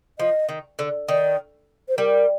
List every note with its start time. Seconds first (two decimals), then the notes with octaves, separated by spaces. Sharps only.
0.19 F3 D#5
0.49 D#3
0.79 D3
1.08 D#3 D5
1.89 C5
1.98 G3 A#4